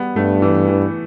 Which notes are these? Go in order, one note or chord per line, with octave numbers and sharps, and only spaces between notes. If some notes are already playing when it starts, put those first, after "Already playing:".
Already playing: G3 B3
G2 A3
E3
E3